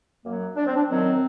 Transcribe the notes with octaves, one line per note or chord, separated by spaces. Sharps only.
F#2 F#3 A#3
D4
C4
D4
F#2 D#3 F#3 C4